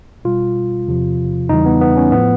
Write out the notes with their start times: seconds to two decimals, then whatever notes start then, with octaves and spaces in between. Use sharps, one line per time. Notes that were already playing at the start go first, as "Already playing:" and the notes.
0.25 B2 G3 F4
0.87 E2 C3 F3
1.49 E2 C#3 E3 G3 D#4
1.66 B3
1.81 B3
1.97 C#4
2.12 A2 F3 B3